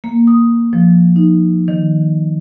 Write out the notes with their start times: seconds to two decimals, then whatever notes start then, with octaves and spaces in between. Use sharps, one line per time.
0.04 A#3
0.27 D#6
0.73 F3
1.16 D#4
1.68 D#3